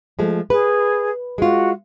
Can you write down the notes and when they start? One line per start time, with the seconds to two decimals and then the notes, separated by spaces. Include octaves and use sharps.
0.19 F3 G#3 A3
0.50 G#4 B4
1.38 G#3 F4 F#4